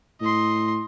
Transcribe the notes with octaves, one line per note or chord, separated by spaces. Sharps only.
A2 D#5 C6